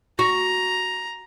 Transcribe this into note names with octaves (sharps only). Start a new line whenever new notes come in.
F#4 A#5